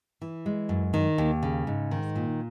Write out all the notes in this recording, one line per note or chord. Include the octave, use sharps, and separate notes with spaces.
E3
G#3
F#2
D#3
D#2
C#3
G#2
D#3
A#2